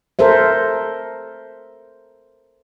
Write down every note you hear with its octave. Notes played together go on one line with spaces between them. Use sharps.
A4 A#4 C5 E5